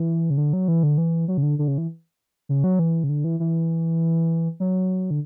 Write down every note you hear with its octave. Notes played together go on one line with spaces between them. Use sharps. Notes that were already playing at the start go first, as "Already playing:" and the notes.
Already playing: E3
C#3
D3
F#3
E3
D3
E3
F#3
C#3
D3
D3
C#3
E3
C#3
F#3
E3
C#3
D3
E3
E3
F#3
D3